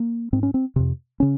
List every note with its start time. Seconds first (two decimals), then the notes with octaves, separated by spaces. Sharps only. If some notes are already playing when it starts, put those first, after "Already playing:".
Already playing: A#3
0.33 G#2 C4
0.43 C#4
0.54 C4
0.76 F2 C3
1.20 C#3 C#4